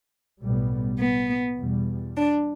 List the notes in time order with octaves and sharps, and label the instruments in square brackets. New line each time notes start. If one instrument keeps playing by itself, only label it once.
[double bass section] B1 A2 G3 B3
[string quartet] B3
[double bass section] E2 B2 G3
[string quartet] D4